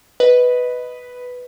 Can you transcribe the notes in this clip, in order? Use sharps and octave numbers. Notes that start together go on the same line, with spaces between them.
B4 D#5